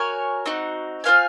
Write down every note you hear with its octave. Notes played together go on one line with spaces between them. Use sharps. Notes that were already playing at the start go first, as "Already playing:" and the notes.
Already playing: F#4 A#4 C#5 G#5
C4 D#4 F#4
F4 C5 F5 G#5